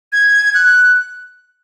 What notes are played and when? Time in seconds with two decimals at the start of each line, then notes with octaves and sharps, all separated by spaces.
0.13 G#6
0.54 F#6